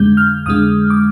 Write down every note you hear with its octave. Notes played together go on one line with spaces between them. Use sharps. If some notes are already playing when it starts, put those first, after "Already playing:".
Already playing: F2 D3 G#3 G6
F6
F2 D3 G#3 D#6
D6